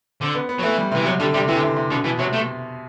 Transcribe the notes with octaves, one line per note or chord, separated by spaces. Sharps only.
D3 C4
B3
B3
F#3
E3 A3
G3
C3
E3
C3 F#3
D3 G3
C3 G3
C3 E3
D3
C3
C3
B2 D3
B2 E3
C3 F#3
A3